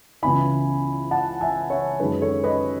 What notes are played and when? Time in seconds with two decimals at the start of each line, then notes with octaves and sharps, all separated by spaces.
0.22 C#2 C#3 E3 B3 E4 G#5 B5
1.11 F#5 A5
1.41 E5 G#5
1.70 C#5 E5
2.00 F#2 D#3 G#3 C#4 B4
2.22 A4 C#5
2.44 B4 D#5